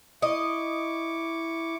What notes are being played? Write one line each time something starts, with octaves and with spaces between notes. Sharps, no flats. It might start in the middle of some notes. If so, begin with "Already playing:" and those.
E4 D#5 C#6 D6